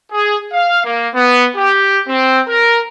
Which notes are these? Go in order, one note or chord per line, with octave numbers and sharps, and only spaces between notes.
G#4
F5
A#3
B3
G4
C4
A#4